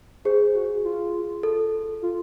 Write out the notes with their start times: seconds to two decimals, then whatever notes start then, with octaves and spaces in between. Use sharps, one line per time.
0.25 G#4 C5
0.54 F#4
0.84 F4
1.43 A4
2.02 F4